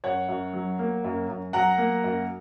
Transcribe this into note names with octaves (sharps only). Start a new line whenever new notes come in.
F#2 C#5 F#5
F#2
F#3
A#3
F#2
F#2
F#3 F#5 A#5
A#3
F#2